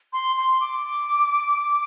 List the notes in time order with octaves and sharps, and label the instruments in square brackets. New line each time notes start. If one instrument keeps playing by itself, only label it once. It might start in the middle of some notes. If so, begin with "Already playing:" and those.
[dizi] C6
C6
D6